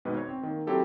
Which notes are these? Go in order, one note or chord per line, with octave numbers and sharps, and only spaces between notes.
G#1 G#2 B2 B4
C#5
C4
D#3 A#3
F#3 C4 E4 G4 A4